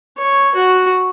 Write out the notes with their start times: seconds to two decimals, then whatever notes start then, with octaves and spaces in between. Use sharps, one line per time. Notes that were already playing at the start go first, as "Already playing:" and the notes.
0.18 C#5
0.55 F#4